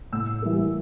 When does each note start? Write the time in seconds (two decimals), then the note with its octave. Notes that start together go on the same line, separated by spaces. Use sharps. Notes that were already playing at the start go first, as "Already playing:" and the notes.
0.12 A2 E6
0.42 E3 G3 A#3